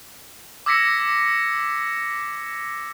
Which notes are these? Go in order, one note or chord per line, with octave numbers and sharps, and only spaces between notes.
D6 E6 G#6 A#6 B6 C#7